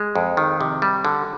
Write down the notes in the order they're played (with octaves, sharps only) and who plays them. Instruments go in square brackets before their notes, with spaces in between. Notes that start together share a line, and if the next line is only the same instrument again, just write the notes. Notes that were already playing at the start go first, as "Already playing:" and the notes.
Already playing: [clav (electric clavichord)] G#3
F2
D#3
C3
G3
D3